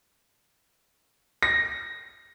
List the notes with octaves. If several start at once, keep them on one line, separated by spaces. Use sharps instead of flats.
A#6